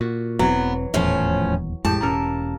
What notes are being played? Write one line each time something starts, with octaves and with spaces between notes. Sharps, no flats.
A#2 F#4
E1 E3 F#3 B3 C4
D#1 E2 A2 F3 C#4
A1 F2 A2 G#3 G4 A5
E1 A#3 C#4 A4 A#4